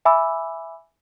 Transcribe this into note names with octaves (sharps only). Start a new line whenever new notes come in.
E5 G#5 B5 D6 E6